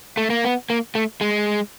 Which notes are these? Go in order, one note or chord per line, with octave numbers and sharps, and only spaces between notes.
A3
A#3
B3
A#3
A3
G#3